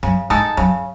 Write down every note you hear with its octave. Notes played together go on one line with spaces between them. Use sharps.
F#2 C#3
G#2 G#3 D#4 A4
F#2 C#3